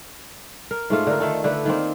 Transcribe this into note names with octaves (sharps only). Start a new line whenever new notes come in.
A#4
G#2 A3 F4
D3 A#4
D#3 A3 A4
D3 A3 B4
D#3 A#3 C4